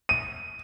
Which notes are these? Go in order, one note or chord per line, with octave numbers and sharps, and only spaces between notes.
D#7